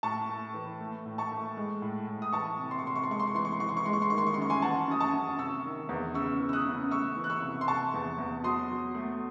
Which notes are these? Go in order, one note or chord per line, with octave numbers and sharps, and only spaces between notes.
A2 A5 C#6
A3
E3
A3
A2
A5 C#6
A3
G#3
A2
A2
D#6
E3 A5 C#6
C3
C6
C#6
C3 C6
C#6
C6
G#3 C#6
C6
C#6
E3 C6
C#6
C6
E3 C#6
C6
C#6
G#3 C6
C#6
C6
D#3 C#6
C6
C#6
C6
F#2 C#6
G#5 C6
E3 F#5 A5
F#2 D#6
A5 C#6
F#2
C3 C#6 E6
D#3
E2
C#3 C#6 E6
E3
E6
D#6 F#6
C#3
A3 C#6 E6
E3
F#6
C#6 E6
C3
C6
C3 A5 C#6
E2
E2
F#3 C6 D#6
F#3
A3